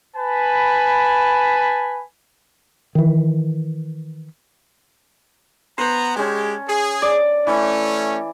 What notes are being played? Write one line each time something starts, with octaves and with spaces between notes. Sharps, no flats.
B4 G#5 A5 B5
D#3 E3
B3 C5 A#5
G#3 C#4 G4 A5
G#4
D5
E3 A3 C#4